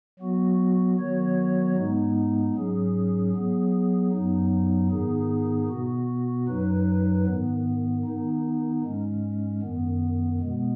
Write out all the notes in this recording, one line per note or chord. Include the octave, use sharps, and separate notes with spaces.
F#3 B3 F#4
D#3 F#3 B3 F#4 C#5
G#2 G#3 B3 D#4
G#2 F#3 C#4 G#4
F#3 B3 G#4
F#2 F#3 B3 D#4
G#2 D#3 B3 D#4 G#4
B2 B3 F#4
F#2 F#3 D#4 B4
G#2 D#3 B3
D#3 B3 D#4
G#2 G#3 C#4
F#2 D#3 B3
B2 G#3 B3